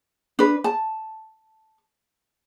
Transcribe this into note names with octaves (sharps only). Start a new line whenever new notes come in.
D4 B4
A5